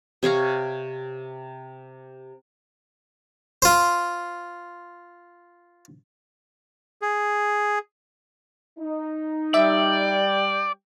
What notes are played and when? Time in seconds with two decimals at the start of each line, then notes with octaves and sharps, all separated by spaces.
0.23 C3 C#5 F5 A#5
3.62 F4 C5
7.02 G#4
8.79 D#4
9.54 G3 D5 E5 G5